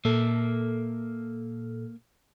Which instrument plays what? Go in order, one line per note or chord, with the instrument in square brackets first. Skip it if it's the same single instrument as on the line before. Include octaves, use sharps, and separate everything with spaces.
[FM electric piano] A#2 A4 [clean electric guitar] A#3 E5